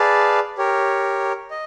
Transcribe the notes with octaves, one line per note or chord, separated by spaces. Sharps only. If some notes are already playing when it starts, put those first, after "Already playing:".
Already playing: G#4 B4 D5 F5 A5
G4 A#4 C#5
D#5